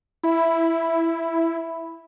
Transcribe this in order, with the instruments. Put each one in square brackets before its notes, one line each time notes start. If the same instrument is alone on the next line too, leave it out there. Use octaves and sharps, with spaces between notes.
[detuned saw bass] E4 [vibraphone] E5 B5